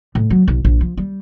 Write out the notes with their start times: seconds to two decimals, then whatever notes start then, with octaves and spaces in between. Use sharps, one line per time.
0.15 A2
0.30 F#3
0.48 B1
0.65 A#1
0.81 F3
0.97 G3